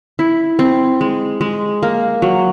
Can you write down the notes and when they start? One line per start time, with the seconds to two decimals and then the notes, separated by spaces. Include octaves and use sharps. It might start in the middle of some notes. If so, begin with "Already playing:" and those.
0.19 E4
0.59 C4
1.01 G#3
1.41 G#3
1.83 A#3
2.22 F#3